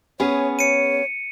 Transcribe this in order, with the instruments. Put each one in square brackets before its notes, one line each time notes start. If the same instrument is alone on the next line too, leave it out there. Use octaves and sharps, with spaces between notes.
[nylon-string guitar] B3 C#4 G#4 [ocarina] C#5
[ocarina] C#5 [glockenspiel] C#7 D#7